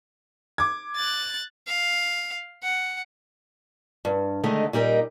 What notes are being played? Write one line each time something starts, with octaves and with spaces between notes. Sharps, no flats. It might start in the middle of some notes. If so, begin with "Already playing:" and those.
D6 G#6
F#6 A6
F5
F#5
G2
D3 D#3 G#3 A3 D#4
A#2 G3 D#4 A#4